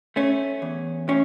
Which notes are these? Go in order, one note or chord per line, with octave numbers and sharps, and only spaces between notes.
A3 C#4
E2
A2 C#4